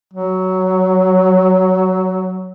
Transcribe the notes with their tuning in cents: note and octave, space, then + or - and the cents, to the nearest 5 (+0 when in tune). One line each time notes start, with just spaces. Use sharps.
F#3 +10